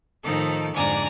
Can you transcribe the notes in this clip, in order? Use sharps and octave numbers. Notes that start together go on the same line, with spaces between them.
A2 D#3 F3 D#4 A4
F2 G#2 D3 D5 G#5 A#5